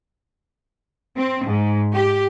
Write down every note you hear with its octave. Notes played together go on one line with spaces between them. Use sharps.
C4
G#2
G4